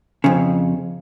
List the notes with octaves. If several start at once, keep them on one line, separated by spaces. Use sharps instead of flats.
F2 C#3